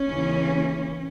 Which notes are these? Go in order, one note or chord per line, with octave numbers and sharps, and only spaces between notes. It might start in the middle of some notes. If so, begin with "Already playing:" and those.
Already playing: C#4
D#2 C#3 E3